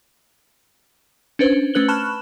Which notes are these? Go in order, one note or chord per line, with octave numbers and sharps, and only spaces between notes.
C#4 D4 B4 C5
A3 C#4 B4 F#6 F#7 G7
A5 B5 C#6 F6 F#6 E7